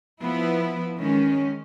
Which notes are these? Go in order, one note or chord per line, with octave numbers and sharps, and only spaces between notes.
F3 B3 E4
D#3 G#3 C#4